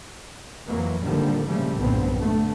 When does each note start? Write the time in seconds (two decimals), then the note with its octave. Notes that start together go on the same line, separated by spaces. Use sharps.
0.67 F2 E3 F#3 A#3
1.03 G#1 A#2 D3 D#3 F3 G3
1.46 A#2 C#3 F3 G3 A3
1.78 B1 G2 A#2 D3 B3 C4
2.19 D3 A3